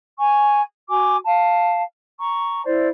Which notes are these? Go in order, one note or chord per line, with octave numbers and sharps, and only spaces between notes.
G#5 C#6
F#4 G#5 D6
F5 A5
A#5 C#6
E4 C5 D5